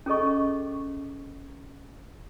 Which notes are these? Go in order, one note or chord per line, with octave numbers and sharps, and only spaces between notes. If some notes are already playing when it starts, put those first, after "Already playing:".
C#4 G#4 A4 D#5 C#6